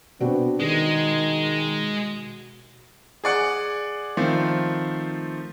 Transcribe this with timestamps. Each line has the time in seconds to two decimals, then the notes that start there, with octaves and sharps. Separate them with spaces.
0.21 B2 B3 C4 D4 F#4
0.60 D#3 G#3 F#4
3.24 G#4 D5 F#5
4.17 D#3 F3 A3 C4